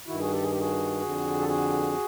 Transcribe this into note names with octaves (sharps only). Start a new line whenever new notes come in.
G2 D#3 E4 F#4
F#4 G#4
G4 A4
G#4
G4
F#4 G#4
F2 D3
A4
F#4 G#4